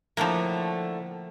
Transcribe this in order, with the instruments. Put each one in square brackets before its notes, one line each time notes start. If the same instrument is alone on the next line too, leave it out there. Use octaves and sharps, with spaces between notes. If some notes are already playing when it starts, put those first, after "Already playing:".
[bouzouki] A2 D3 A3 [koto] F3 A#3